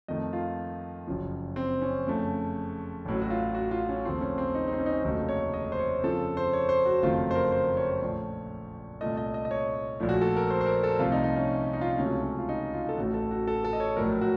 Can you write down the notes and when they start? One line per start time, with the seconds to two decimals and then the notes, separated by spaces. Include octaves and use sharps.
0.08 F2 D#3 A3 D#5
0.33 F4
1.07 F#1 F#2 F3
1.56 C4
1.82 C#4
2.07 F2 C#3 A3
3.05 A1 A2 F#3
3.22 F#4
3.30 F4
3.55 F#4
3.71 F4
3.89 C#4
4.04 D#2 C#3 F3 A3 C4
4.21 C#4
4.38 C4
4.55 D#4
4.67 D#4
4.73 C4
4.79 C#4
4.86 D#4
4.91 C#4
5.03 F1 D#2 C#3 F#3 A3 D#4
5.29 C#5
5.54 D#5
5.72 C5
5.79 C#5
6.03 F2 C#3 F3 A4
6.37 C5
6.53 C#5
6.69 C5
6.86 F#4
7.02 F#1 F2 D#3 F#3 A3 F4
7.31 C5
7.35 A#4
7.52 C5
7.77 C#5
8.02 A#1 A#2 A3
9.01 C2 A#2 A3 D#5
9.17 D#5
9.34 D#5
9.45 D#5
9.51 C#5
10.00 A#1 A#2 F3 A3
10.09 F#4
10.21 A4
10.36 A#4
10.50 C5
10.61 C5
10.66 A#4
10.83 A4
10.99 C2 C3 F3 A3 F4
11.12 D#4
11.24 D#4
11.36 C#4
11.73 D#4
11.81 F4
11.90 D#4
11.98 C#2 C3 F#3 A3 C#4
12.23 C#4
12.38 F4
12.49 D#4
12.74 F4
12.89 A4
12.98 A1 A2 A3 F#4
13.14 A4
13.31 F#4
13.47 A4
13.64 A4
13.73 D#5
13.80 C#5
13.97 A#1 A2 F#3 A3 A#4
14.21 F#4